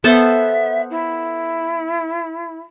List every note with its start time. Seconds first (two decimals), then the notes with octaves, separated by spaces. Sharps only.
0.04 B3 A4 C5 E5
0.90 E4